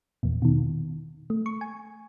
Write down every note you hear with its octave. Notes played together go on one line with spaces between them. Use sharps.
E2 A#2
B2 D#3
A3
C#6
G#5